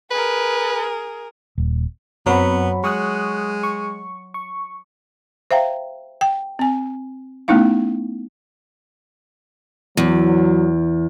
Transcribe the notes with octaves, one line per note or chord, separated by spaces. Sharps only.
G#4 A#4 B4
D#1
F#2 F#3 B3 C4 B5
G#3 C#6 D#6 F#6
C#6
C#6
C5 E5 F5 G5 A#5
G5
C4 G#5
A3 B3 C#4 D#4 E4 F5
E2 F#3